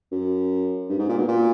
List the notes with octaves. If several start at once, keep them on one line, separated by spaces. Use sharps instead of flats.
F#2
G2
G#2
A#2
B2
A#2